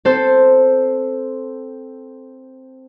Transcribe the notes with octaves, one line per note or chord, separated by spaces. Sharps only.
C4 A4 C5